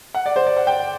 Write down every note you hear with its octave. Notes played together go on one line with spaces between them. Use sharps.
F#5
D5
C5
D5
F#5
G5